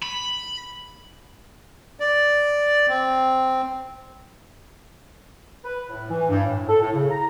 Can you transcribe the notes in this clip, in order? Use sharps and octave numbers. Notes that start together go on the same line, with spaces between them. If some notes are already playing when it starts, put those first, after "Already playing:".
B5
D5
C4
B4
A2
E3
G2
A2
A4
A2
C#3
A#5